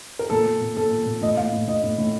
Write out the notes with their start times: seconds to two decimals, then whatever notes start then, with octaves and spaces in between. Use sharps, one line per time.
0.19 A#4
0.30 A#2 A4
0.46 A#2
0.61 A#2
0.76 A#2 A4
0.91 A#2
1.06 A#2
1.22 A2 D#5
1.37 A2 F5
1.53 A2
1.68 A2 D#5
1.83 A2
1.98 A2